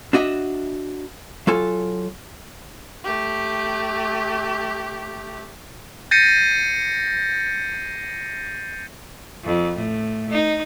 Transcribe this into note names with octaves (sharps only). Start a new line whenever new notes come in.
D4 F#4 D#5 E5
F#3 F4 A4 G#5
A3 G4
G6 A6 A#6 C7 C#7 D#7
F2
A2
D#4